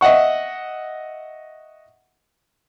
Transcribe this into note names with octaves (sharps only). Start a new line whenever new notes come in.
D#5 E5 F#5 C#6